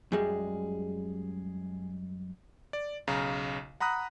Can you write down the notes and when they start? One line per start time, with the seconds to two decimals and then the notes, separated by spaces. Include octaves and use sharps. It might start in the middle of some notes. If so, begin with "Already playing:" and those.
0.12 F#2 G3 G#3 G#4
2.73 D5
3.07 B1 C#3 F5 A#5
3.80 F#5 A#5 B5 D#6 F#6